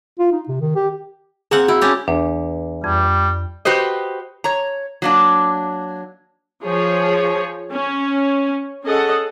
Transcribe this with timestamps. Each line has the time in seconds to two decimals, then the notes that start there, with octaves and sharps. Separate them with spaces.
0.19 F4
0.32 D#4
0.48 C3
0.61 D#3
0.76 G4
1.51 A#3 C4 G#4 F#5
1.68 E4 F#4
1.81 C#4 D4 G4
2.08 E2 D4
2.84 F2 G3
3.65 F#4 G4 B4 C5 D#5
4.44 C#5 A#5
5.02 F#3 A#3 D4
6.64 F3 G#4 C#5
7.71 C#4
8.84 C#4 G#4 A4 D#5 F#5